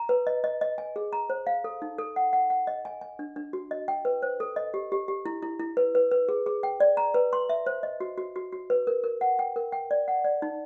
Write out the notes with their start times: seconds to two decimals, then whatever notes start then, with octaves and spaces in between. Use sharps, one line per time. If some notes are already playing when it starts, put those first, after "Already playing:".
Already playing: A#5
0.09 B4
0.27 D#5
0.44 D#5
0.61 D#5
0.78 G#5
0.96 G#4
1.13 A#5
1.30 C5
1.47 F5
1.64 A4
1.82 D#4
1.98 A4
2.16 F#5
2.33 F#5
2.50 F#5
2.67 D#5
2.85 G#5
3.01 G#5
3.19 D4
3.36 D4
3.53 F#4
3.71 D#5
3.88 G5
4.05 B4
4.22 C5
4.40 A4
4.56 D#5
4.74 G4
4.92 G4
5.08 G4
5.26 E4
5.42 E4
5.60 E4
5.77 B4
5.95 B4
6.11 B4
6.29 G#4
6.46 G#4
6.63 G5
6.80 D5
6.97 A#5
7.14 B4
7.33 C6
7.49 E5
7.66 C5
7.83 D#5
8.00 F#4
8.18 F#4
8.36 F#4
8.52 F#4
8.70 B4
8.87 A#4
9.04 A#4
9.21 F#5
9.39 G5
9.56 A#4
9.72 G5
9.91 D5
10.08 F#5
10.25 D5
10.42 D#4